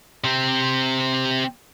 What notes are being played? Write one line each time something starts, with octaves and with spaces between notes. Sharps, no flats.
C3 C4